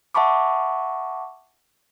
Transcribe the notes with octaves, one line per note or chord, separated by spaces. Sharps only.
E5 F#5 A5 B5 C#6 D6